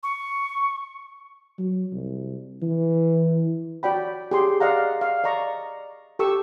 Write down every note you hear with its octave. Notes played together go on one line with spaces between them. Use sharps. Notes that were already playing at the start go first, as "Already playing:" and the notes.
C#6
F#3
C2
E3
F#4 D5 G5 B5
G4 G#4 C6
D5 D#5 F5 F#5 A#5
F5
D5 D#5 A#5 C#6
G4 A4 C#6 E6